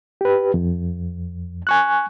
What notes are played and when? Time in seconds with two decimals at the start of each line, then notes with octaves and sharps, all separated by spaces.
0.21 G4 B4
0.54 F2
1.67 G#5 C#6 F#6